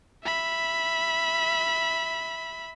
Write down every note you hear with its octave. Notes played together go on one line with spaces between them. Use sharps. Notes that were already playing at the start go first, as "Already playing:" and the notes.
E5 B5